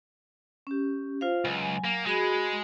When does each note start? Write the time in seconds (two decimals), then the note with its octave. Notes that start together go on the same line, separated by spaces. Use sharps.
0.67 C#4 G4
1.21 F4 C5 F5
1.45 C#2 F#3 G#5
1.84 A#3
2.06 G#3 F#4 G#4 B5